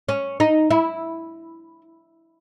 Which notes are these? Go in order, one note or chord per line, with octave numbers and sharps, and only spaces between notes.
C#4
D#4
E4